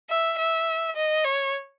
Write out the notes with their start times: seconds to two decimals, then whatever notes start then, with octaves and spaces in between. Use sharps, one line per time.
0.10 E5
0.39 E5
0.96 D#5
1.24 C#5